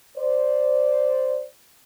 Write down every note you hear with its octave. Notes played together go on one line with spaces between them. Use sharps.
C5 D5